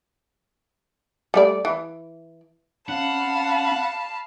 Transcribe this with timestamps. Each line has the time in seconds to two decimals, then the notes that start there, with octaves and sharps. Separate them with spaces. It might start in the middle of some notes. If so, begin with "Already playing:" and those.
1.34 G3 A3 D5
1.65 E3
2.89 C4 C#4 F5 F#5 A5 B5